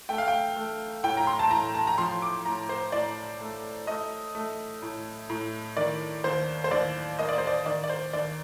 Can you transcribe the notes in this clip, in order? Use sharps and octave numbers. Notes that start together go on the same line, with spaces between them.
A3 G5
F5
G5
A3
A2 G5
A#5
C6
A5
A2 A#5
A5
A#5
F3 C6
D6
A2 A#5
C5
A2 D5
A3
A3 D#5
A3
A2
A2
D#3 D5
D#2 C5
C5
D#2 D5
A#3 D#5
D5
C5
D5
D#3 D5
D5
C5
D#2 D5